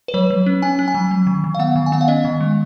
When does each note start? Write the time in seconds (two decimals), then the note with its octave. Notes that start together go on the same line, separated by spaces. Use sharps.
0.08 B4
0.14 F#3 C#5
0.30 F#3
0.46 C#4
0.62 C#4 G#5
0.79 C#4
0.88 G#5
0.94 F#3
1.11 F#3
1.27 D#3
1.44 D#3
1.55 F5
1.59 B3 F#5
1.76 D#3
1.86 G#5
1.92 B3 F#5
2.01 F5
2.08 C#4 D#5
2.25 D#3
2.41 G#3